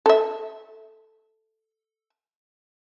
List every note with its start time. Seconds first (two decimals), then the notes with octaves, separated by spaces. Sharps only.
0.06 A4 E5